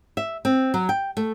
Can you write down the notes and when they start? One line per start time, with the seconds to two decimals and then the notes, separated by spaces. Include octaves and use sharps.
0.17 E5
0.45 C4
0.74 F#3
0.89 G5
1.17 A3